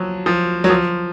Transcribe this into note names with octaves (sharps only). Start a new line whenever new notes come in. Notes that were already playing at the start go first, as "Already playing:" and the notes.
Already playing: F3 F#3
F3
F#3
F3